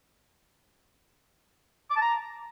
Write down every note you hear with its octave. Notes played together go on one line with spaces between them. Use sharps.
D6
A5
A#5